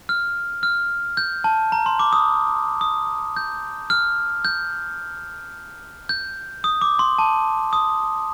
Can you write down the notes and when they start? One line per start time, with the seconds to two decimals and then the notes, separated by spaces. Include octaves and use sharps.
0.09 F6
0.63 F6
1.17 G6
1.44 A5
1.72 A#5
1.86 C6
1.99 D6
2.13 D#6
2.81 D#6
3.36 G6
3.90 F6
4.45 G6
6.09 G6
6.64 D#6
6.81 D6
6.99 C6
7.19 A5
7.73 D#6